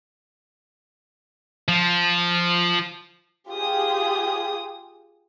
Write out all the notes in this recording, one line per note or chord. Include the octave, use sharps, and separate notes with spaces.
F3
F4 G4 G#4 D#6